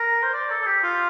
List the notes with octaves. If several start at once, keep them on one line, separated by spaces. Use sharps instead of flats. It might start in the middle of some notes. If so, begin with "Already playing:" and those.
Already playing: A#4
C5
D5
A4
A4
G4
F4